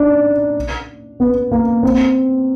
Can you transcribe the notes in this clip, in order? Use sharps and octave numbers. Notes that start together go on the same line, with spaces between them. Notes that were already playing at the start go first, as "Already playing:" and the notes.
Already playing: D4 D#4
B3
A#3
C4